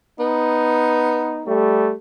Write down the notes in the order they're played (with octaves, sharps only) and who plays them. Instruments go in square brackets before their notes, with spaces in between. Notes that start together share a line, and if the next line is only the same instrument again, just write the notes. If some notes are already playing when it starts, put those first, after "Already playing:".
[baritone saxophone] B3 [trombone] D#4
[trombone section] G3 A3